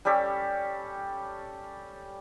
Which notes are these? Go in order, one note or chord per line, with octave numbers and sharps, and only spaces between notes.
G3 C#4 G4 A4